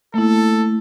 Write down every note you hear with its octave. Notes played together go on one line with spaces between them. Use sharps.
A3 A#3 E4 A4